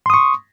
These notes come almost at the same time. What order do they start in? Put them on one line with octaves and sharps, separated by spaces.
C6 D#6 C#6